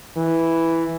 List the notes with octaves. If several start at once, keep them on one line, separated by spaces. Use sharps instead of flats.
E3